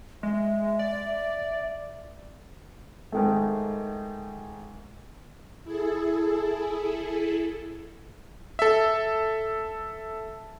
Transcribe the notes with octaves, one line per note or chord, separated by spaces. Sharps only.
G#3 E5
D5
G#2 D#3 A3
E4 G#4 A4
A4 E5